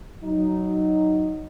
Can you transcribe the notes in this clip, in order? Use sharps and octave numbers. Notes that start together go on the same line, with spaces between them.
F#3 D#4